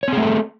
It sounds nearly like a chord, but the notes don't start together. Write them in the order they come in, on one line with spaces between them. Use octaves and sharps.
C#5 C4 G#4 A3 A4